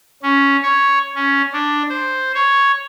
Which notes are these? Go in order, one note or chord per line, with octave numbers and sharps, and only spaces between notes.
C#4
C#5
C#4
D4
C5
C#5